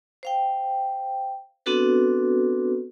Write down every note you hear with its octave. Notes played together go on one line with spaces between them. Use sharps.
C5 F5 G5
B3 C4 D4 F#4 A4 B4